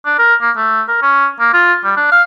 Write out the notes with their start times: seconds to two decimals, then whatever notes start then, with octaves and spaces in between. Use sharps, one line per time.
0.05 D4
0.19 A#4
0.42 A#3
0.57 A3
0.88 A#4
1.02 C#4
1.40 A#3
1.53 F4
1.84 G3
1.97 D4
2.12 F5